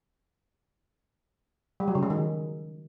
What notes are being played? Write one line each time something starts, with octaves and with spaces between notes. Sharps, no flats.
G3
F#3
C#3
G#3
D#3